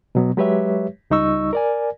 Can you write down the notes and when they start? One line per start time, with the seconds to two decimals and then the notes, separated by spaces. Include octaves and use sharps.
0.15 B2 F#3 B3
0.37 F#3 G#3 G4 B4 C#5 E5
1.10 C#2 G3 D#4 D#5 C#6 E6
1.53 A#4 D5 G#5